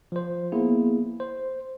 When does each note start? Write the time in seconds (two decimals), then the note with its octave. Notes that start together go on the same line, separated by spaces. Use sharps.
0.12 F3 C5
0.52 A#3 B3 E4 G#4
1.20 C5